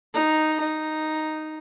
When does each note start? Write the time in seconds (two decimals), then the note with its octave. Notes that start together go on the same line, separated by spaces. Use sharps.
0.14 D#4
0.60 D#4